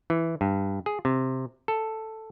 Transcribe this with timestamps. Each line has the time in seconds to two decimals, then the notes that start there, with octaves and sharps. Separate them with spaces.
0.10 E3
0.41 G2
0.86 G#4
1.05 C3
1.68 A4